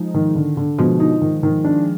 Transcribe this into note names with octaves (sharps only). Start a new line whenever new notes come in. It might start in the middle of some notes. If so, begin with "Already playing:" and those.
Already playing: F3 G#3 D#4
D#3
D3
D3
B2 F3 G#3
D#4
D#3
D#3
D4